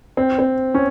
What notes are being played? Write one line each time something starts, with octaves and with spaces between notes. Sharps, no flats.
C4
C4
C#4